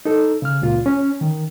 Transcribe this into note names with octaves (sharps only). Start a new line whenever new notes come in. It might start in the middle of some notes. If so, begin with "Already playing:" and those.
D#4 A4
C#3 F6
C#2 A#2 F4
C#4
D#3